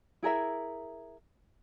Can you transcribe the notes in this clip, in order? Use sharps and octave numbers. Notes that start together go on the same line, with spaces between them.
E4 G#4 A#4 E5